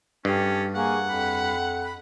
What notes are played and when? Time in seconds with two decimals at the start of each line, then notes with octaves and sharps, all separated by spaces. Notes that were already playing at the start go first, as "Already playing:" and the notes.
0.25 G2 C#4 G4 A4
0.75 A#3 G#4 F#5 G#5 C#6
1.07 F2 B5
1.82 B5